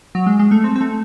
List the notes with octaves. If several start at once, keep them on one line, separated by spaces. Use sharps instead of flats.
F#3
G#3
G#3
A3
C4
C4
A3